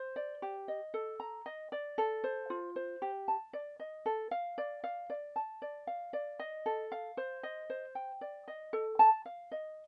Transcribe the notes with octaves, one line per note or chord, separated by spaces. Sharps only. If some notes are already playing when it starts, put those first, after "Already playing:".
Already playing: C5
D5
G4
D#5
A4
A#5
D#5
D5
A4
C5
F4
C5
G4
A5
D5
D#5
A4
F5
D5
F5
D5
A5
D5
F5
D5
D#5
A4
F5
C5
D#5
C5
G5
D5
D#5
A4
A5
F5
D#5